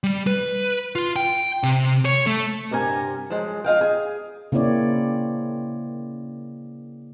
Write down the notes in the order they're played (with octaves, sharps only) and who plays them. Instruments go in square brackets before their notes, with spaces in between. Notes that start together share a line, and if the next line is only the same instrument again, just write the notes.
[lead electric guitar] G3
B4
F4
G5
C3
C#5
A3
[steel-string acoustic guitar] G2 C3 A#4 G#5
F3 F#3 G#3
F4 D#5 F5 G5
G#4
[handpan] C#3 A#3 C4 E4 C#5 D5